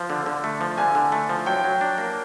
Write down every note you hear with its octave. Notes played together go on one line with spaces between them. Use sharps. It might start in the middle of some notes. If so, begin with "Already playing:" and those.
Already playing: F3
D3
D3
A3
F3
D3 G#5
D3
A3
F3
F#3 G5
F#3
D4
A#3